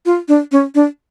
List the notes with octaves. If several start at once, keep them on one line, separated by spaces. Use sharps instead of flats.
F4
D4
C#4
D4